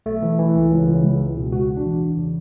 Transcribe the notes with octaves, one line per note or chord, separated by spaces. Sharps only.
B1 A3
E3
E3
C#2
C#2
C#2
C#2
C#2
B2
A1 F#4
A1
D4
E3
E2
C#3